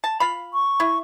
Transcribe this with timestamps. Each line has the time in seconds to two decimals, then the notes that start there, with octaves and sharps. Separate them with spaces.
0.04 A5
0.20 F4 F5 B5
0.53 C#6
0.80 E4